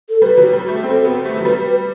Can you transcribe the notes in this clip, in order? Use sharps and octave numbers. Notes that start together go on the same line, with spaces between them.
A4
G3 B4
F#3
G3
A3
C4 A4
B3
A3
F#3
G3 B4
B4